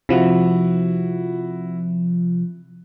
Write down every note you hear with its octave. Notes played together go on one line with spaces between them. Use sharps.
C3 F3 E4 F#4